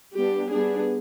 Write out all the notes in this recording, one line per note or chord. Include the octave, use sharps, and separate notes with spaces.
G3 B3 D4 G4
G3 B3 D4 G#4